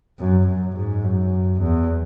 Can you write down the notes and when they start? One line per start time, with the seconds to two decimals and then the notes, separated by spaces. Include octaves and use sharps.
0.19 F#2
0.48 F#2
0.76 G#2
1.04 F#2
1.61 E2